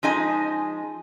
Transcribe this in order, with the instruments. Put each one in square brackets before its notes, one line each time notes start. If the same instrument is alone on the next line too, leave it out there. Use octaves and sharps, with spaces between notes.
[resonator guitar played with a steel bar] F3 G#3 D#4 G#4 D#5 G#5